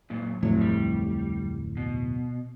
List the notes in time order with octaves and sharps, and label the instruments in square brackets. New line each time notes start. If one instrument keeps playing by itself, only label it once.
[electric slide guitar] F#2 A#2
[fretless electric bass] D1 F2 A2 [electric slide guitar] F#3
[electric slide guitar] G3
B2